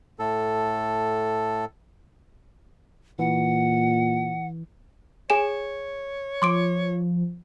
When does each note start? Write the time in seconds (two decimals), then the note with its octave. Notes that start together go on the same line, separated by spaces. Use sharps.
0.19 A2 A4
3.19 A#2 E3 F#5
5.30 G#4 C#5 G#5 E7
6.42 F3 C6 D6 D7